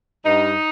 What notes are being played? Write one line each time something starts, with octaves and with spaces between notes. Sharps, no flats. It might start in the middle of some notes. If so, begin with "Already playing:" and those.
G2 D#4